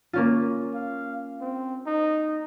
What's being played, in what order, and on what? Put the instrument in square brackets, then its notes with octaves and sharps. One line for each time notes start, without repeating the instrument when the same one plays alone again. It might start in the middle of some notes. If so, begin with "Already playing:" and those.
[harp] A#3 C#4 F4
[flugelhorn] F5
C4
D#4